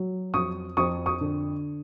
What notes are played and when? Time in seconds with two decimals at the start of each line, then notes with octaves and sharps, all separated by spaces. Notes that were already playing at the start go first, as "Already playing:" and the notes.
Already playing: F#3
0.33 F2 C#6 D#6
0.77 F2 C#6 D#6
1.06 C#6 D#6
1.21 D3